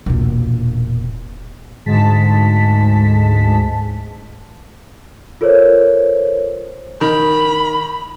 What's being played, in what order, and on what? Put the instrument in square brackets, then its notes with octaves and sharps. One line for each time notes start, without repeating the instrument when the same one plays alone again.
[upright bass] E1 A#2
[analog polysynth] D2 G#2 G#3 A5 B6
[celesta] F4 A4 A#4 C5 C#5
[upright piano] D#3 [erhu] B5